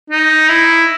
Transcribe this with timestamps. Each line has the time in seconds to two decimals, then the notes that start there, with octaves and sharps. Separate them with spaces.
0.10 D#4
0.49 E4